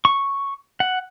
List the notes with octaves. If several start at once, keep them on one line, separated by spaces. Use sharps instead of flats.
C#6
F#5